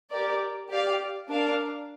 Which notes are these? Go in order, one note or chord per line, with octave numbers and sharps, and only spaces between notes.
G4 A#4 D5
G4 D5 F5
D4 A#4 F5